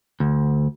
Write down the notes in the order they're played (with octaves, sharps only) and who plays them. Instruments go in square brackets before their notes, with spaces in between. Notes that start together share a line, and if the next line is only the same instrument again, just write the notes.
[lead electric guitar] D2